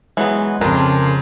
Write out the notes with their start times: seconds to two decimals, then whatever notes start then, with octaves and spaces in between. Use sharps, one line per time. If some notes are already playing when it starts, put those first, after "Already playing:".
0.17 E3 F#3 G#3 B3
0.61 F2 C#3 D4 A#4 C6